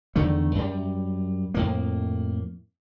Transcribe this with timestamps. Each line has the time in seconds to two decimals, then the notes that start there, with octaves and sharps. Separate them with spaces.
0.16 E2 D3 D#3 A3
0.55 F#2 G3
1.54 F2 A2 A#3